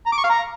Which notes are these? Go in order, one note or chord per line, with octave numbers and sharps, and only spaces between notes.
A#5
D6
C#6
F5
A#5